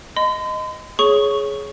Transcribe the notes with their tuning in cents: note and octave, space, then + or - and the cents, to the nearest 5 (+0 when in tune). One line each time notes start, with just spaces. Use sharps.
D#5 +0 C6 -45
G#4 +15 C#5 +0 C#6 +0